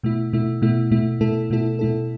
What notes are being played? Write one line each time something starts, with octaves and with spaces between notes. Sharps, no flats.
B2 A3 E4
B2 A3 E4
B2 A3 E4
B2 A3 E4
B2 A3 E4 A4
B2 A3 E4 A4
B2 A3 E4 A4